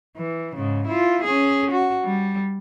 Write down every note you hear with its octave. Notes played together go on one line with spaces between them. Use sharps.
E3
G#2 C#3
E4 F4
C#4 G#4
F#4
G3